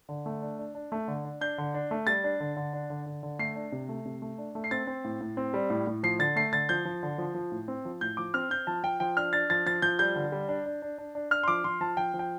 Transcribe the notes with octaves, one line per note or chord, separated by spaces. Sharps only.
D3
A3
D4
D4
D4
A3
D3
D4
D4 G6
D3
D4
A3
G3 A6
D4
D3
D3
D4
D3
D3
D3
A3 C7
D4
C3
A3
C3
A3
D4
A3
C7
C4 A6
C4
A2
A2
C4
G3
A2
A2
F3 C7
D3 A6
A3 C7
D3 A6
F3 G6
F3
D3
F3
F3
A2
C4
F3
A2 G6
F3 D6
C4 F6
C4 G6
F3 A5
F3 G5
F3 G5
D4 F6
D4 A6
F3 A6
F3 A6
F3 G6
G3 G6
D3
G3
D4
D4
D4
D4
D4
D4 F6
C6
F3 D6
F3 C6
F3 A5
F3 G5
F3
G5